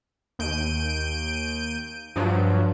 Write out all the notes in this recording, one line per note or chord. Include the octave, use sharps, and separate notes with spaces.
D#2 G6 D7 D#7
G2 F3 F#3